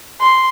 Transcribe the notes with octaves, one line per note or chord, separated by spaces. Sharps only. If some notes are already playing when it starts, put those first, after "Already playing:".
C6